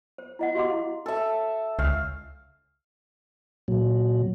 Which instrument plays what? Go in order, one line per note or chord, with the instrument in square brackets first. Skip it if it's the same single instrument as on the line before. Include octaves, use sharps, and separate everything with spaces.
[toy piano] C5
E4 D#5 F#5
F#4 G4 D#5 F5 C6 D6
E4
[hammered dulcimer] A4 E5
[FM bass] C#2 [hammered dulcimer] F5
[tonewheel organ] A#2 F#3